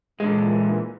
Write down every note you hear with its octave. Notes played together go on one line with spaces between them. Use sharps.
A#2 D3 E3 G#3